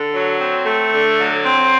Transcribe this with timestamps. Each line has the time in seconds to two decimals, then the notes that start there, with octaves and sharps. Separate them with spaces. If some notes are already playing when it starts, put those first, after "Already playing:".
Already playing: D3
0.13 F#3
0.39 C4
0.66 A3
0.92 D3
1.18 F#3
1.45 C4